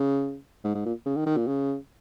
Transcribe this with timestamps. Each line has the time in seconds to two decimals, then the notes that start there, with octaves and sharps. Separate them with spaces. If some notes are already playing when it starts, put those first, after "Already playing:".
Already playing: C#3
0.64 G#2
0.75 G#2
0.86 A#2
1.06 C#3
1.16 D#3
1.26 D#3
1.37 A#2
1.47 C#3